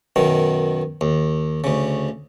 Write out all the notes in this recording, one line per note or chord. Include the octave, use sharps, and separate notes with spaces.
F#2 B2 D#3
D#2
D2 C#3